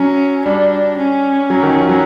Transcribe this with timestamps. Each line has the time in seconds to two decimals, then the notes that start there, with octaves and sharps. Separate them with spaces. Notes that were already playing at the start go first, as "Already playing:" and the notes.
Already playing: F#3 C#4
0.45 G3 D4
0.98 C#4
1.50 F#3
1.63 D#3
1.76 F3
1.89 F#3